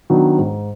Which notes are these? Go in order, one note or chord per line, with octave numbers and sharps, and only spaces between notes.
D#3 F#3 B3 D4
G#2